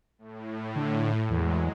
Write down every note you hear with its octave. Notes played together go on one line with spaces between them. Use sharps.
A2
D3
E2 F#3 G#3